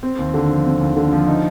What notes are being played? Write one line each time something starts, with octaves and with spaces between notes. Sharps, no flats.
C4
D#2
D3
F3
C4
D#2
D3
F3
D#4